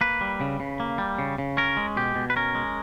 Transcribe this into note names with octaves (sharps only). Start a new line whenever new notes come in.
A#3 B4
G3
C#3
C#3
A#3
G3
C#3
C#3
C#4 A#4
G#3
B2 G4
B2
B4
C#4 A#4
G#3